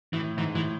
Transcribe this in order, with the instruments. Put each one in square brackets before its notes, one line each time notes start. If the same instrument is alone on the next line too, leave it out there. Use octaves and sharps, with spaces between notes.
[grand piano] A2 [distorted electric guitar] E3
[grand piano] G#2 [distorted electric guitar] E3
[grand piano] A2 [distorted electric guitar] E3